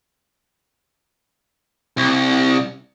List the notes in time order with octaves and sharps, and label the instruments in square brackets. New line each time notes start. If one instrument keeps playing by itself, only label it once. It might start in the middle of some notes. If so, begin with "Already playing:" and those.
[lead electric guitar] C2